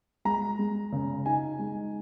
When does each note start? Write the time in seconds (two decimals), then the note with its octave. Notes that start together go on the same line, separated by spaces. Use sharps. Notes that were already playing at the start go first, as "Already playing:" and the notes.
0.25 G#3 A#5
0.59 G#3
0.93 C#3
1.26 D#4 G#5
1.59 G#3